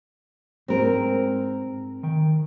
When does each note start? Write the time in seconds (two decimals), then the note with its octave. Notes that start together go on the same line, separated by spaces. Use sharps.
0.68 G#2 G#3 C4 A#4
2.03 D#3 G5